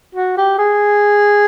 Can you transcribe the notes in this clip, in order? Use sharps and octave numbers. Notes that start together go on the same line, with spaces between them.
F#4
G4
G#4